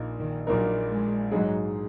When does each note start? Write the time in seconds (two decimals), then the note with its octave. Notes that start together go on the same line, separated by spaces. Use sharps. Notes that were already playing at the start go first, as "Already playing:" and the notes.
Already playing: A#1 A#2 A#3 D#4 A#4
0.19 D#3
0.47 A#1 A#2 F#3 A#3 D#4 A#4
0.90 G#3
1.31 G#2 F#3 G#3 D#4 G#4